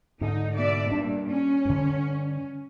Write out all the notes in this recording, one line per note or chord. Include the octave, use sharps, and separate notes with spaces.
G#2 D3 D#4
B2 D5 E5
G2 A#2 D4
C#4
G2 D3